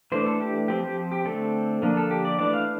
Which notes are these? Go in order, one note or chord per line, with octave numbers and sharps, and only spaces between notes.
E3 A3 D4 C5
A4
G4
F3 C4 G4
G4
G4
D3 A3 C4 A4
D3 F3 A#3 D4
A4
G4
D5
E3 A3 D4 D5
F5